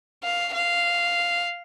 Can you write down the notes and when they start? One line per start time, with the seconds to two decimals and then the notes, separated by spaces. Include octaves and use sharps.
0.24 F5
0.54 F5